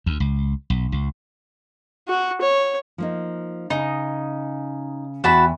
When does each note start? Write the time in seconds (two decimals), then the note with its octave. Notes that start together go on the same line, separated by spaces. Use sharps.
0.06 D2
0.20 C#2
0.70 B1
0.92 C#2
2.09 F#4
2.41 C#5
2.98 F3 A#3 D#4
3.70 C#3 D#4
5.24 E2 E3 F#4 G5 A5 B5